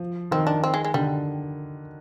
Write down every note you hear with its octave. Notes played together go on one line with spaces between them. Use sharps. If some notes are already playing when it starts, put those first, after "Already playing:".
Already playing: F3
D#3 C4
D4
C4
G#3
G#3
D3 G3